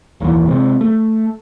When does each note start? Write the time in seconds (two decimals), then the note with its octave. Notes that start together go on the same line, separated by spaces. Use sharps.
0.20 F#1 D#2 A#2 E3
0.47 C3 G#3 C4
0.81 A3